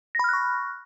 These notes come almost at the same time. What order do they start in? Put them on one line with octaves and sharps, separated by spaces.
A#6 B5 F6 F#6 C#6